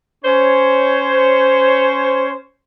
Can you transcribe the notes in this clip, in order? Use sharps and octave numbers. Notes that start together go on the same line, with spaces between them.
C#4 C5 C#5